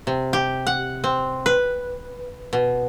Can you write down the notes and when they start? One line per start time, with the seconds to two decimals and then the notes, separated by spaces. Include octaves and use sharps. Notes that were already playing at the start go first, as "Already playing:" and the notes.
0.07 C3
0.33 G4
0.67 F#5
1.04 C4
1.46 B4
2.53 B2